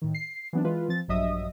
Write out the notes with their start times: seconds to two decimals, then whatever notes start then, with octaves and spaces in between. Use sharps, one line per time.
0.02 A2 D#3
0.14 C7
0.53 E3 F#3 B3 C4 D4
0.64 E3 G#3 F4 B4
0.89 F3 C4 A6
1.08 A#1 G2 F#3 D#5 E5 D#6